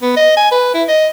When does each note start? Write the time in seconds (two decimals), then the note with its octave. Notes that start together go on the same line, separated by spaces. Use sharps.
0.02 B3
0.17 D#5
0.37 G#5
0.52 B4
0.75 E4
0.88 D#5